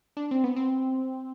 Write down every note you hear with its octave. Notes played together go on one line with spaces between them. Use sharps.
D4
C4
B3
C4